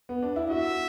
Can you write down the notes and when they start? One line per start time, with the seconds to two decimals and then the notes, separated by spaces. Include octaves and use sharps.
0.09 B3
0.22 D4
0.36 E4
0.50 F#4 E5